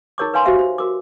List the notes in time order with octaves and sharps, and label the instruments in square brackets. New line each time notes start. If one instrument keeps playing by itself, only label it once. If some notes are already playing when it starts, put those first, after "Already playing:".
[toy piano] D#4 G#4 A#4 C#5 C#6 D6
B4 C#5 F5 G#5 C6
F#4 G4 C5 E5 F5 G#5
C5
F#4 A#4 D6